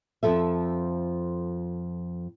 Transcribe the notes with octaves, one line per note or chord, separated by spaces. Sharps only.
F2 B2 F3 A4 E5